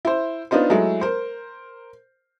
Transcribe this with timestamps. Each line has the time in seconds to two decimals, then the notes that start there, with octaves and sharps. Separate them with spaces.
0.05 E4 C5
0.51 B3 D4 D#4 F4 C5
0.70 F#3 G#3 A3 E4
1.01 A#4 C5